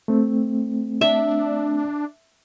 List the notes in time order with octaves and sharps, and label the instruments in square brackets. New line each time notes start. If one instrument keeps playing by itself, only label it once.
[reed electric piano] A3 C4
[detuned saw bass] D4 [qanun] E5